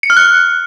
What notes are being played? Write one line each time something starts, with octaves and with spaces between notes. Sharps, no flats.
C#7
F6
F#6